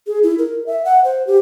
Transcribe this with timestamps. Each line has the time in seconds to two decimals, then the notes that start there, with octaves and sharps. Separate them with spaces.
0.07 G#4
0.23 E4
0.38 A#4
0.66 E5
0.85 F#5
1.04 C5
1.27 G4